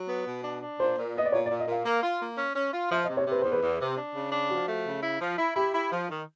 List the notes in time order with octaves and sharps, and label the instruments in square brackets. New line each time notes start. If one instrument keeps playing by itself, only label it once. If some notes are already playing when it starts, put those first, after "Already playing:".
Already playing: [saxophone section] F#3
B3
B2
D4
D4
[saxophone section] A#2 [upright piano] C5
[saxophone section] A#2
[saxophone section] B3 [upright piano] D#5
[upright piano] D5
[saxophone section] A#2 [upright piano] C#5
[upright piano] D5
[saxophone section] A#2
[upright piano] D#5
[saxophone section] A#2 [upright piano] F5
[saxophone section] A#3
F4
A#3
C#4
C#4
F4
[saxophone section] F3 [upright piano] E5
[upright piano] D#5
[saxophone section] C3
[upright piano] C#5
[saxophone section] C3 [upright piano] B4
[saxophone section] E2 [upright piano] C5
[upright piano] B4
[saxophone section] E2
C3
D4
C#3
D4
[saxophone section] F3 [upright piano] F#4
[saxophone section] A3
C#3
E4
F3
E4
[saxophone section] E4 [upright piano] G4
[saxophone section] E4
F3
D#3